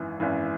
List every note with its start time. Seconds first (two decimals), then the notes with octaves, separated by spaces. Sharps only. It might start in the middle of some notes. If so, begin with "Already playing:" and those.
Already playing: G#1 F#2 E3
0.20 G#1 F#2 E3